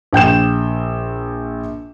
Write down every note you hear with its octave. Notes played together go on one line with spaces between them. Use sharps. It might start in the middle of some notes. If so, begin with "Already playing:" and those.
A#1 G5 G6 E7